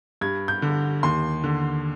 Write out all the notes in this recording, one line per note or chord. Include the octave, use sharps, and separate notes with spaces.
G2 G#6
G6
D3
D#2 C6
D3